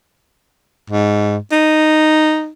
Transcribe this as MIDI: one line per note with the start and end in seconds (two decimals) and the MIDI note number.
0.90 1.37 44
1.52 2.48 63